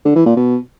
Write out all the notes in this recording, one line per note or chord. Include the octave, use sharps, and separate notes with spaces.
D3
E3
A#2
B2